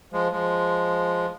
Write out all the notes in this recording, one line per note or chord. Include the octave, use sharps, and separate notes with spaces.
F3 G#3
F3 G#3